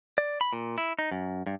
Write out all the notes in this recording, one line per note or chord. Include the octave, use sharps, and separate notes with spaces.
D5
B5
A#2
E4
D#4
F#2
G2